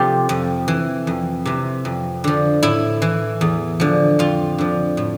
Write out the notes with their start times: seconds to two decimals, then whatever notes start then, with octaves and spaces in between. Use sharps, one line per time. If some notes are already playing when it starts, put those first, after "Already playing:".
Already playing: C3 F3 F4 G4 A4
0.29 F2
0.68 E3
1.07 F2
1.45 C3 E3
1.85 F2
2.24 D3 F3
2.63 A2 E4
3.02 E3
3.41 E2
3.80 D3 F3
4.19 F2 F4
4.58 D3 F3
4.97 A2